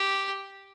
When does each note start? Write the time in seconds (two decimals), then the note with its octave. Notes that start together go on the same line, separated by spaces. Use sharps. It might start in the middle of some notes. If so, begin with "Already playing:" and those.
Already playing: G4